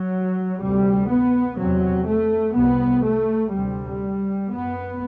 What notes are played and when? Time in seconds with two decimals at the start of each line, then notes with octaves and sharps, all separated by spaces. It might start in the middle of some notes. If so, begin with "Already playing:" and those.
Already playing: F#3
0.60 D2 C3 G3
1.08 B3
1.57 E2 C3 F#3
2.06 A3
2.55 C2 C3 B3
3.04 A3
3.53 D2 C3 G3
4.50 F#2 B3